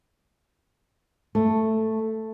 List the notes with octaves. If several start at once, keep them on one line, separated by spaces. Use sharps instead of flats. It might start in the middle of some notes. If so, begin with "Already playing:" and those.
A3